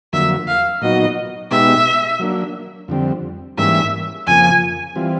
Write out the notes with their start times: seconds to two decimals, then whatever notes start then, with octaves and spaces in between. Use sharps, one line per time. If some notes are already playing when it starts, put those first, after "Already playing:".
0.13 F2 D3 F#3 A#3 E5
0.47 F5
0.82 A#2 F#3 B3 D#4 F#4 D#5
1.51 B2 G#3 B3 D#4 G4 E5
2.19 F#3 A#3 D4
2.88 F2 D3 G3 C4
3.58 G#2 E3 G3 A#3 C#4 E5
4.27 F2 C#3 F3 A#3 G#5
4.95 E3 G3 C4 F4